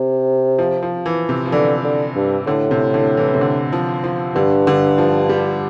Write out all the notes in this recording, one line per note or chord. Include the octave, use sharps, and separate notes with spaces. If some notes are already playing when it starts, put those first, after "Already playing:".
Already playing: C3
F3
F3
E3
C3
F3
D3 E3
D3
G2
A2 D3
C3
D3
E3
C3
D3
F3
F3
G2 D3
D3
F3
G3